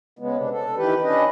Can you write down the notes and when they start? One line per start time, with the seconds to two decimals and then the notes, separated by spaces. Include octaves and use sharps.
0.19 C#3 G#3 B3
0.37 C3 D4
0.51 A4
0.76 D#3 E3 G4 B4
1.02 C#4 D4 B4 D#5